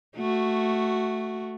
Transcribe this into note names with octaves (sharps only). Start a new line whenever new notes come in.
A3 F#4